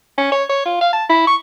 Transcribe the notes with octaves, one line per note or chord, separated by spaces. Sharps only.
C#4
C#5
C#5
F4
F5
A5
E4
C#6